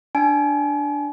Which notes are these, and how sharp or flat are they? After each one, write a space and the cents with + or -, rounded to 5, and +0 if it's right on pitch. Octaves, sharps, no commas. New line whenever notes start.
D4 +0 G#5 +45